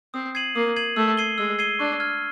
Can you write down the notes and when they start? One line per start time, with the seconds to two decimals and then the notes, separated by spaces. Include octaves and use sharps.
0.14 C4 D#6
0.35 G#6 C7 D#7 F#7
0.55 A#3 D#6
0.76 G#6 C7 D#7 F#7
0.96 A3 E6
1.17 G#6 C7 D#7 G7
1.38 G#3 E6
1.59 G#6 C7 D#7 G7
1.79 D4 C#6
2.00 F6 G#6